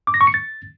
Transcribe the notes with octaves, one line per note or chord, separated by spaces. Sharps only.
D6
A#6
C#6
C#7
A6